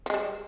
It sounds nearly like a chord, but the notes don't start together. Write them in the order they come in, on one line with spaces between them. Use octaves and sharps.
F3 G#3 G3